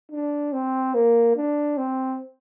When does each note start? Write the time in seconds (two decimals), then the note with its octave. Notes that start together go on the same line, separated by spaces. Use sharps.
0.11 D4
0.53 C4
0.94 A#3
1.36 D4
1.77 C4